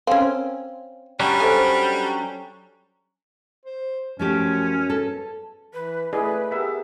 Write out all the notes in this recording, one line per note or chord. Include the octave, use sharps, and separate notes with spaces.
C4 C#4 F5
F#3 G3 C#4 D4 D5
A4 C5 E5 G#5
C5
F#2 F3 A3 C#4 G4
A4
E3 B4
A3 E4 G#4 B4 D5
B3 G4 G#4 A#4 E5